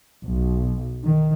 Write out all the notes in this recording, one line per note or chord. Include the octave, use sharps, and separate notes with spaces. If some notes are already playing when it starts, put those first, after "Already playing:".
B1
D#3